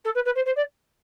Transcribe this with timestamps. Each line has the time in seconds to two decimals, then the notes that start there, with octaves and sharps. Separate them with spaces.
0.04 A4
0.15 B4
0.25 B4
0.35 C5
0.45 C5
0.56 D5